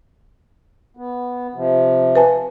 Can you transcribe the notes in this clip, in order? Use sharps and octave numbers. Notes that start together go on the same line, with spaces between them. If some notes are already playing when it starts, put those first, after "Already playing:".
B3
C3 F3
B4 G#5 A5